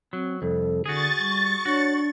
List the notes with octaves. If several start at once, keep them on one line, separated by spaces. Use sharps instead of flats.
F#3 C4
C2 F2 A4
D3 F#4 G#4 C#6 A6
G3
D4 F#4 C#5